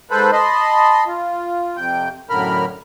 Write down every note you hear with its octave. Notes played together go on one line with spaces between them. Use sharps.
G#2 A4 B4 C5 B5
D#5 A5 B5 C6
F4
F2 C3 G5 G6
F#2 A2 D3 A#4 B5 F6